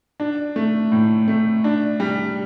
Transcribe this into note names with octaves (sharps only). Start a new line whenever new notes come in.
D4
A3
A2
A3
D4
G3